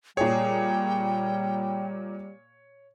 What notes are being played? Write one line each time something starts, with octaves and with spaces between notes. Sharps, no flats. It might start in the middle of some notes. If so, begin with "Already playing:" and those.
A#2 G3 G#4 C#5 G5